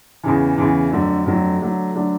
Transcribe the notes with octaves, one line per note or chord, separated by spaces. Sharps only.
E2 C#3 E3
E2 C#3 E3
F2 D3 F#3 A3
F2 D3 F#3 A3
D3 F#3 A3 D4
D3 F#3 A3 D4